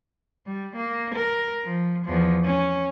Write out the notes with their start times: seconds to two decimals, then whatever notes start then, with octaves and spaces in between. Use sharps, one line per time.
0.46 G3
0.76 A#3
1.14 A#4
1.64 F3
2.05 E2 F3
2.44 C#4